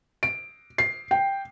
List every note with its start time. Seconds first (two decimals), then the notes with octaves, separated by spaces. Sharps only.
0.23 D7
0.78 C7
1.11 G5